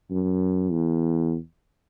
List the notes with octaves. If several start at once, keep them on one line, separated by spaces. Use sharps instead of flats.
F#2
E2